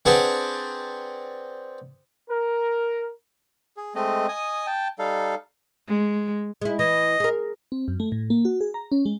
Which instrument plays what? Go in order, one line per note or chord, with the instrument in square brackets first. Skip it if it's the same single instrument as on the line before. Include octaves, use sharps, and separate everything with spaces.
[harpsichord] C4 D4 G#4 B4 F#5 A5
[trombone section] A#4
[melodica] G#4
G#3 A3 C4 D#5
D#5 G#5 D#6
G5 A5
G3 D#4 A4 F5
[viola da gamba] G#3
[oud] G#3 E4
[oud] E3 [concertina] D#5
[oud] G#4 A#4
[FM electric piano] C4
F#2
A3
A2
A#3
F#4
G#4
A#5
C#4
G#3